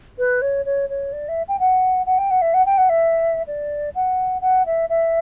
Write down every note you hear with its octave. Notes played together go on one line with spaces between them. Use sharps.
B4
C#5
C#5
C#5
D5
E5
G5
F#5
F#5
G5
F#5
E5
F#5
G5
F#5
E5
D5
F#5
F#5
E5
E5